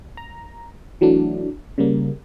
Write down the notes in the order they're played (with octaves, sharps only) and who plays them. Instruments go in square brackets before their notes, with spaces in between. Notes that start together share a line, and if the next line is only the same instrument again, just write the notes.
[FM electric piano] A#5
E3 F#3 A3 D4
C#3 G3 A#3